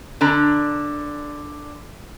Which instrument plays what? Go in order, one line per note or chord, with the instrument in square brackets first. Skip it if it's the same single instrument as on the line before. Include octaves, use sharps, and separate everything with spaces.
[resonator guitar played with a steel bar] D3 D4 A#5